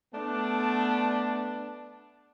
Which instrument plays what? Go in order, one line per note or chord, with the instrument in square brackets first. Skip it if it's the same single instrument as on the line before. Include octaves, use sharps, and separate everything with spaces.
[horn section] A3 B3 D4